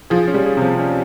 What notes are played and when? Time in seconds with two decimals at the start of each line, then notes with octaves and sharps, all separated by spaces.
0.10 F3 G#4
0.28 C#4
0.34 G3
0.46 G#4
0.57 C3 F3
0.79 C#4